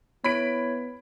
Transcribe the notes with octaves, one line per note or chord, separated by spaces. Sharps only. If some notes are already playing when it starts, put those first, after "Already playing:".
B3 E4 C#5 B5 B6 D7